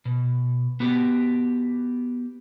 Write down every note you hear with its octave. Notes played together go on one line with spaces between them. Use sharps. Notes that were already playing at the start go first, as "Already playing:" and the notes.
B2
B3 F#4 G4